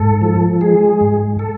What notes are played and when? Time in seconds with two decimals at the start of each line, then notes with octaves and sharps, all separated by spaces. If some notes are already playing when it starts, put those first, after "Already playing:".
Already playing: G#2 A4
0.22 F3
0.61 G#3 G#4
1.01 G#2
1.39 A4